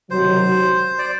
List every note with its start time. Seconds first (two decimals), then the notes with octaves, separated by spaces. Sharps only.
0.10 C#2 C3 D#3 F#3 C5
0.98 D5